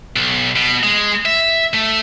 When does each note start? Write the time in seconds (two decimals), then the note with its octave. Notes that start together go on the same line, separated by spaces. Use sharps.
0.16 B1
0.56 B2
0.83 G#3
1.25 E5
1.74 A3